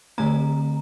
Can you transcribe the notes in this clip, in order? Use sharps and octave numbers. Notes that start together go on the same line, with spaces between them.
D3 A3 C4 A#5